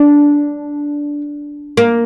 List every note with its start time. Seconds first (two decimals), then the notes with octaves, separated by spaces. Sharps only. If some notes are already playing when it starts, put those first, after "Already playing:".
Already playing: D4
1.77 A#3